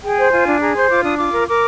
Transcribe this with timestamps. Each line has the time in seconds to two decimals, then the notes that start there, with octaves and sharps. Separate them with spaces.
0.03 G#4 G5
0.18 C5
0.31 F4 G#5
0.46 D4
0.60 G#4 A#5
0.75 C5 C6
0.89 F4 D6
1.04 D4 D#6
1.18 F4 D6
1.33 A#4
1.47 A#4 D6